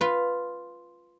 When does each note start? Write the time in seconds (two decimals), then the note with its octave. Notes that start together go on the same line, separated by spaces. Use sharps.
0.01 F4 B4